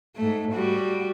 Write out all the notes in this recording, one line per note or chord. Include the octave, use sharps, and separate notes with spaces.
G#2 A3
G3 F#4